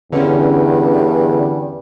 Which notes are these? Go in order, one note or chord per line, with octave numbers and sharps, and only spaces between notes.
E2 G2 D3 C#4